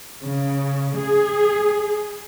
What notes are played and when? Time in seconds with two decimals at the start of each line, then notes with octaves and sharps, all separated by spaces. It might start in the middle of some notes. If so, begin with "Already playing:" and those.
0.24 C#3
0.97 G#4